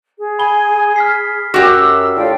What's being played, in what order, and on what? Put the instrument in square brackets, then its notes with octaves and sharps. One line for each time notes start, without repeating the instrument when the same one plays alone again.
[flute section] G#4
[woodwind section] G#5 [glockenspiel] B5 G7
[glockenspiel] F6 B6 C7
[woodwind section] F#2 [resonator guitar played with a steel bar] F#4 G4 [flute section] E6
[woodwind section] A2 D3 [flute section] F4 A4 G5